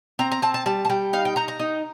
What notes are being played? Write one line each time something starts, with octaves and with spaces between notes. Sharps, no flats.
C4 A#5
A#5
C4 A5
A5
G3 A5
A5
G3 G5
D#4 F5
G5
D#4 A#5
A#5
D#4